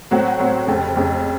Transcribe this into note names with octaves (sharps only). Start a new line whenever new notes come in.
A2 F#3 C4 F#4
A2 F#3 C4
F1 F2 C#3
F1 F2 C#3